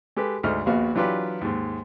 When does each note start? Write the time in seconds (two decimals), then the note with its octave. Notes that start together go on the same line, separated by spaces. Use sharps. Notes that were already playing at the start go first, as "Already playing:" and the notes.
0.16 G#3 G4 A4 B4
0.43 D2 G#2 A4 D#5 F6
0.66 A#1 D#2 B3 F#4 F5
0.95 E3 F#3 D4 F4 G4 B4
1.41 D#2 G#2